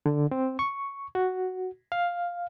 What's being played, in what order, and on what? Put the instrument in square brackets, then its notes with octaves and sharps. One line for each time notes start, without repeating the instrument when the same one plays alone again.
[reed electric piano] D3
C4
C#6
F#4
F5